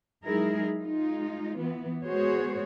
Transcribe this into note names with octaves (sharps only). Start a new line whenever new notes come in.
F#3 G#3 D#4 E4 G#4 A#4
G#3 D#4 F4
E3 B3
G#3 B3 F#4 G#4 C5 C#5